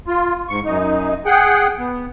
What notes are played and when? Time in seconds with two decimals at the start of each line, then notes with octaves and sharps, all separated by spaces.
0.08 F4
0.49 G#2 C#6
0.65 F#2 D#4
1.26 G#4 F#5 G5
1.79 B3